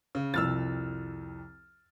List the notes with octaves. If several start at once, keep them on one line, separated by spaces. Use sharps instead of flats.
C#3
C2 F2 E6 F6 A6